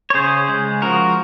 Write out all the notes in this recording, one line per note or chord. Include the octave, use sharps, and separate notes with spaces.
C#5
C#3 G#4 C5
G#3
F3 F#4 A#4